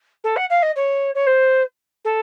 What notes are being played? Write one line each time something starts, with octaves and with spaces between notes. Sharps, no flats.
A4
F#5
F5
D#5
C#5
C#5
C5
A4